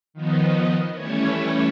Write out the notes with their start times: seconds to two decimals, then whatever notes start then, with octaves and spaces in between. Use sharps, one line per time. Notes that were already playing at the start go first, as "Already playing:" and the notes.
0.14 D#3 F3 B3 D#4
0.94 E3 G3 A3 C#4 E4 C#5